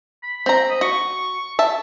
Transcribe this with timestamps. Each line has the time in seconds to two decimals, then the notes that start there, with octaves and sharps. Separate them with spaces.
0.23 B5
0.46 C4 A#5
0.70 D#5
0.81 F#4 C#6
1.59 E5 A5